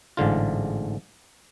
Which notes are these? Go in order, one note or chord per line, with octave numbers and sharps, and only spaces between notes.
A1 G#2 D3 F4